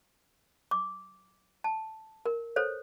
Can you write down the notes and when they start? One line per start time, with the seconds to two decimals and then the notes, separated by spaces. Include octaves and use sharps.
0.71 D6
1.64 A5
2.26 A#4
2.56 A4 C5 C#5